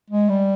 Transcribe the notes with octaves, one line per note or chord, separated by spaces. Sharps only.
G#3
G3